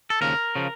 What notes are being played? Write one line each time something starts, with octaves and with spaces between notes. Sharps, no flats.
A4
D#2 C#3 F3 A#4
C#3 F3